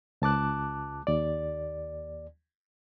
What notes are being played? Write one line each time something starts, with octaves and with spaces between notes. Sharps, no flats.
C#2 A5 D6 F#6
D#2 D5